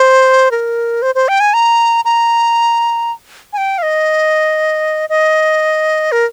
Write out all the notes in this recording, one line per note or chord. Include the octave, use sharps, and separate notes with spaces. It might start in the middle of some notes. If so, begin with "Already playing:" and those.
Already playing: C5
A#4
C5
C5
G5
G#5
A#5
A#5
G#5
G5
F5
D#5
D#5
A#4